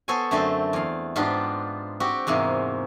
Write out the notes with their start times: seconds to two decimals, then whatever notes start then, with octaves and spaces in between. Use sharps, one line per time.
0.08 B3 A4 C5 C#5 G#5
0.31 F#2 D3 A3 C4 C5 A5
0.73 E2 F5
1.16 G#2 B3 D4 F4 G4
2.00 C4 F#4 G4
2.27 E2 G#2 C3 A#3